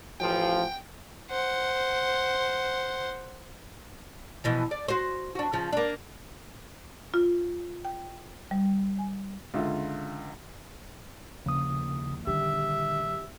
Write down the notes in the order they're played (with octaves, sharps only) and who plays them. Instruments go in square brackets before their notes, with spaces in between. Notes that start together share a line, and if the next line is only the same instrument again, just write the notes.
[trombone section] A1 F3 [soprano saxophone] G5
[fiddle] C5 F#5
[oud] B2 E3 F3
D5
F#4 C5
D4 F#4
C#3 F3
A#3 D4
[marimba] F4
G5
G3
G#5
[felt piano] C#2 D3 F4 E5
[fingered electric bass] D#2 F3 A#3 [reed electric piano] C#3 D#6
[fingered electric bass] A#1 D#3 G3 [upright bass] D3 [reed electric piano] G4 [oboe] E5